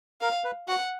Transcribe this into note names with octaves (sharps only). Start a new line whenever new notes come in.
A#4 F5
B4
F#4 F#5